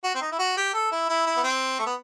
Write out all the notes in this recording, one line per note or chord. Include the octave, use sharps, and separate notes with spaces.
F#4
C4
D#4
E4
F#4
G4
A4
E4
E4
E4
B3
C4
A3
B3